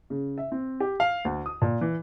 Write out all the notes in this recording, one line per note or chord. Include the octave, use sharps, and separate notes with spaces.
C#3
E5
C4
G4
F5
D2
D#6
A#2
E3